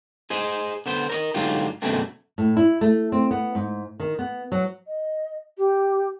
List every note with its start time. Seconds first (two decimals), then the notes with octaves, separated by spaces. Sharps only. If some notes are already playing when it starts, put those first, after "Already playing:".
0.30 G#4 C5 D#5
0.86 D3 B3 C5
1.10 A#4 C#5 D#5
1.34 G#2 D3 F#3 F4 G4
1.82 F#2 B2 D3 G#3 A3 C4
2.38 A2
2.57 E4
2.81 A3
3.12 C4
3.31 B3
3.55 G#2
4.00 D#3
4.19 B3
4.52 F#3
4.87 D#5
5.58 G4